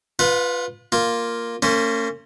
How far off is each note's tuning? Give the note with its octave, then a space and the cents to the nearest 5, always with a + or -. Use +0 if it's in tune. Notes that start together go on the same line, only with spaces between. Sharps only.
F4 +0 B4 +0 F#5 -45
A#3 +0 F4 +0
A#3 -40 C#4 +0 C5 +5